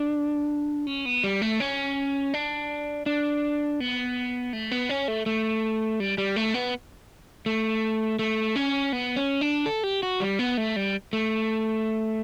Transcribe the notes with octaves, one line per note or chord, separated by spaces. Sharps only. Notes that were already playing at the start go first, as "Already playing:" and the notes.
Already playing: D4
C#4
B3
G3
A3
C#4
D4
D4
B3
A3
B3
C#4
A3
A3
G3
G3
A3
B3
A3
A3
C#4
B3
C#4
D4
A4
G4
F#4
G3
B3
A3
G3
A3